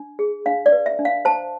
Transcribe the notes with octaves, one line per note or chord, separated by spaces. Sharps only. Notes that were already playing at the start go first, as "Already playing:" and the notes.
Already playing: D4
G#4
D4 F5
D5
B4
E5
D4
F5
C5 A5